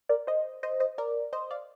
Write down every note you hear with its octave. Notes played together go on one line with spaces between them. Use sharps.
A#4 D5
C5 D#5
C5 D#5
C5 D#5
A#4 D5
C5 D#5
D5 F5